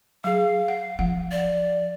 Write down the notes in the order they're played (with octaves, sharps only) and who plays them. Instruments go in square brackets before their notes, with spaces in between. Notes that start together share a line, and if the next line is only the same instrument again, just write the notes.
[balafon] F#3 G#4 [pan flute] F5
[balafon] F#5
[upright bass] F3 [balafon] F#5
[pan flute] D5